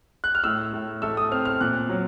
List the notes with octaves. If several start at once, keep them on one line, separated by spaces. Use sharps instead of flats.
F#6
F6
A2 E6
A2
A3 E6
D#6
C4 F6
F6
A#2 F#6
F#3